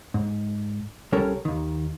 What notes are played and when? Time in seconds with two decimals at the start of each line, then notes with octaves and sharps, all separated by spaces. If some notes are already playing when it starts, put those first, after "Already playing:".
0.14 G#2
1.12 C2 G3 C#4 A4 A#4 C#5
1.45 D#2 D#3